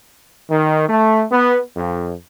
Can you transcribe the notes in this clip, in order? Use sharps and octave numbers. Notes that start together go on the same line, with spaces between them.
D#3
A3
B3
F2